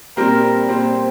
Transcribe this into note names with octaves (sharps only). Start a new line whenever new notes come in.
A#2 G3 C4 A#4
A#2 G3 C4 C5